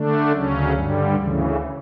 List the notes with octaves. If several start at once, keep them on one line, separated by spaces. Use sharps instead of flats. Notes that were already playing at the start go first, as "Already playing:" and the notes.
Already playing: D3 A3 D4
D2 C#3 F#3 C#4
G2 D3 G3
D2 C#3 E3